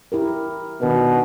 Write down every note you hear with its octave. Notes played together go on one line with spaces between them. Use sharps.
E4 G4 A#4
B2 D#3 D4 B4